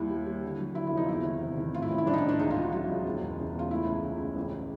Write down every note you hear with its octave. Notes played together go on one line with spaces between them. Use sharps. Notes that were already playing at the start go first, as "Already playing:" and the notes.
Already playing: D#2 G3 E4
G3
G3
D3
F#3
D3 E4
E4
F1
D#4
F4
E2 E4
D#3
C3
D#3
A2 F4
E4
A1
E4
A1 D4
D#4
D4
A2
D4
C#2 D#4
F4
C#2
F#4
F#3 F4
C#2
E1
E2
C#3
E2 F4
A3 E4
C#2
C#3
C#2
A1